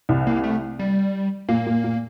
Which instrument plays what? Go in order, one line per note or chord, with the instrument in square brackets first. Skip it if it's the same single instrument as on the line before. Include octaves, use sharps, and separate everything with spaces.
[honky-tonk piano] C2 C3
[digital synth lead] A#3
A3
G3
[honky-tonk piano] A#2 [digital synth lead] A#3
[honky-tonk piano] A#2
A#2